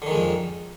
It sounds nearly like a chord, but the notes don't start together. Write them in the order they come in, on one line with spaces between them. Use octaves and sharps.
D3 D#3 G#3 F2